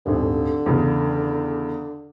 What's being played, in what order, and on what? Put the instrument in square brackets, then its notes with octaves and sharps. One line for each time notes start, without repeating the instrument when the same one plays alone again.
[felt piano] D#1 G#1 [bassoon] D3
[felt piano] E2 C#3